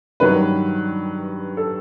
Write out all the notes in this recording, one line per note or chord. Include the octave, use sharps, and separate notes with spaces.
G2 D#3 F#3 B4
A4